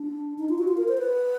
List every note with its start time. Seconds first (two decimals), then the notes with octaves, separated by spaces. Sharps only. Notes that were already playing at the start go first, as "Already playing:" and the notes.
Already playing: D4
0.38 D#4
0.49 F4
0.58 F#4
0.68 F4
0.77 A#4
0.88 C5
0.98 B4